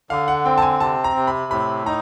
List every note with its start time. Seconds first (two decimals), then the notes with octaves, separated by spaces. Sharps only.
0.10 D3 F5
0.28 F#5
0.45 C4 G5
0.58 A5
0.62 G#5
0.80 C3 A5
1.04 A#5
1.16 C3
1.27 B5
1.51 A2 B5
1.86 D#4 A#5